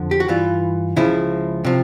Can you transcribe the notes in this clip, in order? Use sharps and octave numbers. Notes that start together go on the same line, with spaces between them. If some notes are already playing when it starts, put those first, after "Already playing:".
Already playing: F2 D3 F3
G4
F#4
G2 E3 F4
C#2 C#3 F3 E4
C3 F3